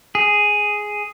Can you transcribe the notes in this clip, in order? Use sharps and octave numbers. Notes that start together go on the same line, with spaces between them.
G#4